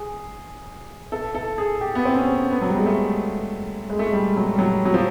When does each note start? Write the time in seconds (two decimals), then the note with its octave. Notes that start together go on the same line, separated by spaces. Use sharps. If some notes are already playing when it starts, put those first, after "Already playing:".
Already playing: G#4
1.12 A4
1.35 A4
1.58 G#4
1.81 G4
1.95 B3
2.05 C4
2.16 C#4
2.51 B3
2.61 F#3
2.70 G3
2.78 G#3
2.86 A3
3.90 G#3
3.99 A3
4.06 G#3
4.13 G3
4.36 F#3
4.54 G3
4.59 F#3
4.85 F#3
4.94 F3